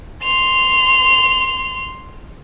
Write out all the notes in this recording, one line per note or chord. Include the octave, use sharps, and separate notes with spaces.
C6 F7